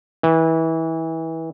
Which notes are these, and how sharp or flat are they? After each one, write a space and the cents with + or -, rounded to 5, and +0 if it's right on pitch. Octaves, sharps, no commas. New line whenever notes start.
E3 -25